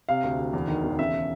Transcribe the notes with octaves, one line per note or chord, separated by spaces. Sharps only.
C3 F5
D2
D2
E2
D#3
E1
C#3 E5